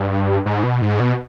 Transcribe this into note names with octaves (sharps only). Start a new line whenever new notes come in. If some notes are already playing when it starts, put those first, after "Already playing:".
Already playing: G2
G#2
B2
G#2
B2